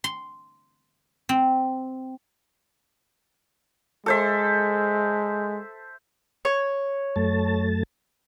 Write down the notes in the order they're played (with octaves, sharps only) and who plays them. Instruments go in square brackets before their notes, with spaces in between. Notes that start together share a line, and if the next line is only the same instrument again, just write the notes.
[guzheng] C6
C4
[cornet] G#3 [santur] A4 C5 E5
[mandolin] C#5
[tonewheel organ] F#2 A3 A5